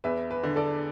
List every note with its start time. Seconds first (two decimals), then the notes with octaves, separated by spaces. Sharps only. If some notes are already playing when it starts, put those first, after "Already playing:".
0.04 E2 B4 E5
0.31 B4
0.44 D3
0.56 A4 D5